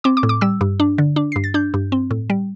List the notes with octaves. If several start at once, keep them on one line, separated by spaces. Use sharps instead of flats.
C4 D6
D6
A2
D6
G3 E6
G2
D4
D3
D4
G2 C7
A6
D4 G6
G2
C4
A2
G3